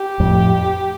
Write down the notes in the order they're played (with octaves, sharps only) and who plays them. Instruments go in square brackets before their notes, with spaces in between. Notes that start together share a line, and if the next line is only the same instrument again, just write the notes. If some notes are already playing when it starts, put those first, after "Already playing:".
Already playing: [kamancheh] G4
[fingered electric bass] F2 A2